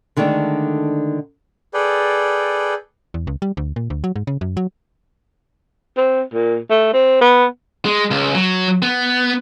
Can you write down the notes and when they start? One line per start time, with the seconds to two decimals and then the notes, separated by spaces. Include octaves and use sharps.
0.17 D3 D#3 G#3 A3 D4
1.74 G#4 A4 B4 D5 G5
3.14 E2
3.27 C#2
3.42 G3
3.57 D2
3.76 A#2
3.90 D2
4.04 F#3
4.16 G#2
4.27 C#3
4.41 F#2
4.57 F#3
5.97 C4
6.34 A#2
6.70 A3
6.94 C4
7.21 B3
7.85 G#3
8.11 C#2
8.35 F#3
8.82 B3